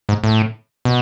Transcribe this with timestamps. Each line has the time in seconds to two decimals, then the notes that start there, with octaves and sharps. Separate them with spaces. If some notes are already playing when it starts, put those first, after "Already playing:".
0.09 G#2
0.24 A2
0.85 B2